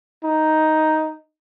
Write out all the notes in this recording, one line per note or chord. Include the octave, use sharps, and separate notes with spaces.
D#4